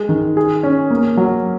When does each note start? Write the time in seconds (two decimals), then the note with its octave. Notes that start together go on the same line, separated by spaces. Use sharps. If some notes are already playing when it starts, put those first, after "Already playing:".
Already playing: G#3
0.09 D#3
0.37 G#4
0.63 C#4
0.91 A#3
1.17 F#3